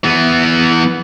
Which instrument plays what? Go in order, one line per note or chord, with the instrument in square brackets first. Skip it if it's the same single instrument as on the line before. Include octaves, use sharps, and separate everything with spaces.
[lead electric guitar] E3 B3